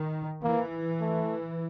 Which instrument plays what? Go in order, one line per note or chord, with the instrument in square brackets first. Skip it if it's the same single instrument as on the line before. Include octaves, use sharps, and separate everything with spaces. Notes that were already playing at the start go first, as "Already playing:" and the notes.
Already playing: [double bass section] D#3
[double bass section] E3 [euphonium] A#3
[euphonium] A3